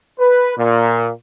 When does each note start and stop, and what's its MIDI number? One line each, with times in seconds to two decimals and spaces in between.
0.18 0.53 71
0.57 1.09 46